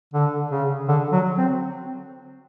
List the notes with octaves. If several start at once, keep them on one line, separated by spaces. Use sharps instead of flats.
D3
C#3
D3
F#3
C4